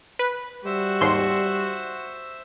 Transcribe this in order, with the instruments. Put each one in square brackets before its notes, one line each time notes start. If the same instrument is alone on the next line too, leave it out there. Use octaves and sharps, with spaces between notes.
[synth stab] B4
[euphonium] G3 [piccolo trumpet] F#4 [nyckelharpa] C5 E5
[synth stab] G#1 D#2 C6